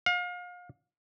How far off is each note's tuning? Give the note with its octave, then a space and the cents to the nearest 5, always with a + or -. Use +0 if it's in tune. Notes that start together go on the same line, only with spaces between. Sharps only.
F5 +35